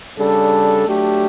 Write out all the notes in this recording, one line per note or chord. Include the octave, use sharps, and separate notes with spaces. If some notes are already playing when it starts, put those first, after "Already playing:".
C#3 G3 D4 A4
F#3 A3 D4 G4